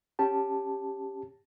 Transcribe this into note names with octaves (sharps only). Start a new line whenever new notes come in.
C#4 G4 A5